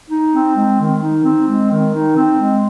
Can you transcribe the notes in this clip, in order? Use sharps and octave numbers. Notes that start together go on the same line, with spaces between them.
D#4
C4
G#3
D#3
D#4
C4
G#3
D#3
D#4
C4
G#3